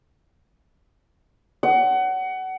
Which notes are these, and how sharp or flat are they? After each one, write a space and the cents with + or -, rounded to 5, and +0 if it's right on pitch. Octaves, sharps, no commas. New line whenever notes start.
F#5 +25